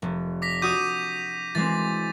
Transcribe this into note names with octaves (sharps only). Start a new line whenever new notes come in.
F1
D6 A#6 B6
D4 F#4 D6 D#6 G6 D#7
E3 G#3 C4 A6